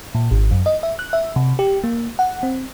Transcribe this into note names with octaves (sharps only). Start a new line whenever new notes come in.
A#2
G#1
F#2
D#5
E5
F#6
E5
C3
G4
A#3
F#5
C4